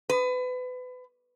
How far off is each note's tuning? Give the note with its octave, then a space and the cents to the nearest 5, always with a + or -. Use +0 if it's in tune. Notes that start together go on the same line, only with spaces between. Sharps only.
B4 +30